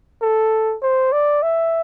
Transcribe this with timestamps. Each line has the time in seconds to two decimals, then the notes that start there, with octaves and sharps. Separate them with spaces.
0.22 A4
0.82 C5
1.12 D5
1.43 E5